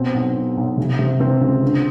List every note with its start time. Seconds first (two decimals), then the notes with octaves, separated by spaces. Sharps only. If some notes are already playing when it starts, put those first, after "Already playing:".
Already playing: B2 C4
0.14 B1
0.35 B2
0.57 B1
0.77 C3
0.99 C3
1.20 C3 C4
1.41 C#2
1.63 D3